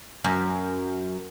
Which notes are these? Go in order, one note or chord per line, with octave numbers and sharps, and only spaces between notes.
F#2